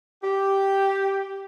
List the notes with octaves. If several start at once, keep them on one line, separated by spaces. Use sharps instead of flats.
G4